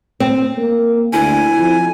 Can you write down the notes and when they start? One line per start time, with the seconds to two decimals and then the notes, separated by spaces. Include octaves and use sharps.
0.20 C4
0.57 A#3
1.13 D2 E4 G#5
1.57 F2